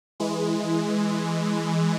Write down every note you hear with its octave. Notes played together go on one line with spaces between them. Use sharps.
E3 G#3